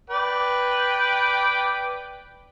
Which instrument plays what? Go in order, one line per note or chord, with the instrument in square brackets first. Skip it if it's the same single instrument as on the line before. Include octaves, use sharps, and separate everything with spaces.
[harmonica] B4 D5 G5